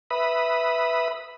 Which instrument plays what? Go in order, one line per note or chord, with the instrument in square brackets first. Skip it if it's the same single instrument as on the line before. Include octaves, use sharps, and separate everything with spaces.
[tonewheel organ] B4 E5 B5 D#6